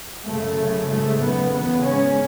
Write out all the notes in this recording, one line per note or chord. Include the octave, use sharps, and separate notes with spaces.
F#2 C#3 A3
F#2 C#3
G#2 A3
F#2 C#3 B3
E2 C#3 B3
G#2 C#4